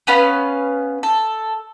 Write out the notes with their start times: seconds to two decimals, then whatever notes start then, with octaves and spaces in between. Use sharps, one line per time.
0.07 B3 C#4 B4 F5
1.03 A4